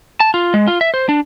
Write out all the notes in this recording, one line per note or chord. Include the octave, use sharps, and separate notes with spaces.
A5
F4
G#3
F4
E5
C5
D4